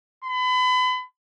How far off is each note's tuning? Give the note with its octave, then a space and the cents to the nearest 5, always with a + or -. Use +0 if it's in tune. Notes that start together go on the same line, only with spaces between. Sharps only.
B5 +35